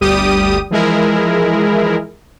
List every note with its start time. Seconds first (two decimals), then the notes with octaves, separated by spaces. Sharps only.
0.01 G1 D2 G3 G4 D#6 D#7
0.71 E3 F3 G#3 E4 G#4 A#4